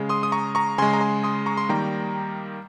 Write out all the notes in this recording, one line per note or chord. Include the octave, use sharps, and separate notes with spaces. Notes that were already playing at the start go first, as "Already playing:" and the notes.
Already playing: C#3 G#3
C6 D#6
D#6
A#5 C#6
A#5 C#6
C#3 G#3 G#5 C6
A#5
G#5 C6
C6 D#6
A#5 C#6
C6
D#3 G3 A#3 G5 A#5